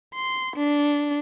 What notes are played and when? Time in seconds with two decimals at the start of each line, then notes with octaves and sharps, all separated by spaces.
0.15 C6
0.56 D4